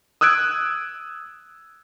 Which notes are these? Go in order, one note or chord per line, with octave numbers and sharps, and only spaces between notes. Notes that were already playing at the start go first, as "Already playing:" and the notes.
D#6 E6 F#6 G#6 D7